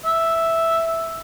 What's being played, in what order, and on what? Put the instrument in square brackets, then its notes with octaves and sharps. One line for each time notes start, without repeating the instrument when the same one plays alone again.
[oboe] E5